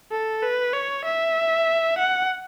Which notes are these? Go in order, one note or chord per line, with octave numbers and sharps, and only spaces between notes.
A4
B4
C#5
E5
F#5